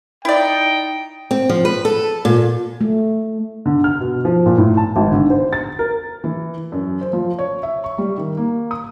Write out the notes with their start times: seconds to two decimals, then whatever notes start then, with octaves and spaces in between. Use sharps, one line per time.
0.25 D#4 E4 D5 G5
1.31 C4
1.49 F3
1.65 B4
1.85 A4
2.25 A#2
2.81 A3
3.66 D3
3.84 F6
4.00 B2
4.25 F3
4.46 A#2
4.58 A2
4.77 A5
4.96 G#1
5.12 D3
5.30 C5
5.53 A6
5.79 A#4
6.24 E3
6.72 F#2
7.01 C5
7.13 F3
7.39 C#5
7.63 E5
7.84 C#6
7.98 G3
8.18 D#3
8.37 A#3
8.71 D#6